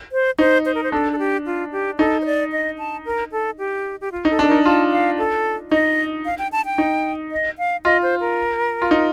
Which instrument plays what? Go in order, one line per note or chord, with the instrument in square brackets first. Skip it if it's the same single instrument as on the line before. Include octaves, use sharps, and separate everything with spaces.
[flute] C5
[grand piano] D#4 [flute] C5
[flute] C5
A#4
C5
[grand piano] D4 [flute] A4
[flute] A4
G4
F4
G4
[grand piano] D#4 [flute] A4
[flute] C5
D5
D#5
A5
A#4
A4
G4
G4
F4
[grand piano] D#4
[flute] A4
[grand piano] D4
[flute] A4
[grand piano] D#4 [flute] A#4
[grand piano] F4 [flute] A5
[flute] F5
A4
[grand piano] D#4 [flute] D#5
[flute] F5
G5
A5
G5
[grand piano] D#4
[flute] D#5
F5
[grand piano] F4 [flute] D#5
[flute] C5
A#4
[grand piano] F4
D#4